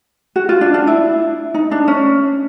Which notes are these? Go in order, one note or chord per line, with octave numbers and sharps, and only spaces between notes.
F#4
F4
D4
D4
E4
D#4
D4
C#4